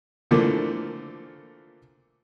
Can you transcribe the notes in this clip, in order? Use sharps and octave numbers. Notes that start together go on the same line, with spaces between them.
A#2 D3 E3 F3 A3 A#3